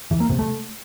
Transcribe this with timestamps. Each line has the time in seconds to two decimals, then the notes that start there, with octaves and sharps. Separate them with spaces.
0.11 E3
0.20 A#3
0.29 C3
0.39 A3